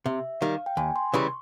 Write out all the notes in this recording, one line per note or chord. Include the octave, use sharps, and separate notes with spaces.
C3 E5
D#3 G3 F5
G5
D#2 G#5
C6
C#3 E3 G3 C#6